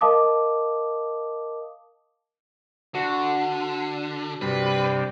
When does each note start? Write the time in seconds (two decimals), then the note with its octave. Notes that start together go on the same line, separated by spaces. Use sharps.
0.01 A#4 D#5 F5 A5 D6 D#6
2.95 D3 F#4
4.42 G2 C3 G3 B4